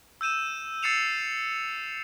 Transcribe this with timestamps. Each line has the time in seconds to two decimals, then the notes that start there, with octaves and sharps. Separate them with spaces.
0.21 E6 G6 D#7 E7
0.83 E6 A6 C7 C#7 E7 F7